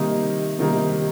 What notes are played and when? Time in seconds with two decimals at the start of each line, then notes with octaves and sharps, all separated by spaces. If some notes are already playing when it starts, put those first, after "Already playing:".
Already playing: C3 D#3 G3 A#3 D#4
0.59 C3 D#3 G3 A#3 D#4